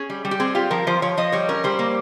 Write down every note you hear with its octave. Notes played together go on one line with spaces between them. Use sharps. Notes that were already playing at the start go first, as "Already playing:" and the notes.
Already playing: C#4 G#4
G3
G3
G4
C4 G#4
F4 G4
F3 A#4
F3 C5
F3 C#5
F3 D#5
G3 C#5
C#4 A#4
G3 C5
A#3